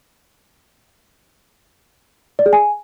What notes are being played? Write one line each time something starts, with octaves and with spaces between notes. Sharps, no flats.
D5
G#4
G#5